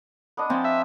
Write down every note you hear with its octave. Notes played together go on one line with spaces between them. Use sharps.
B3 D4 D#5
F3 C4 G#5 A5
E5